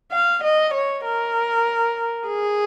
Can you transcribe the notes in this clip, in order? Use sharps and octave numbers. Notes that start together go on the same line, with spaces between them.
F5
D#5
C#5
A#4
G#4